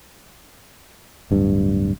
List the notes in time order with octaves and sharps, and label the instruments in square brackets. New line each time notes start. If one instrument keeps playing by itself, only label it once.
[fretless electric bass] D1 G2